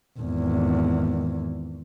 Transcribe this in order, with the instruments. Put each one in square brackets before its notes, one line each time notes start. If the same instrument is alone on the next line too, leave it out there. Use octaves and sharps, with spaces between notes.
[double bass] G#1 E2